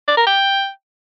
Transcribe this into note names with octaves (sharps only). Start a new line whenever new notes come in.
D5
A#4
G5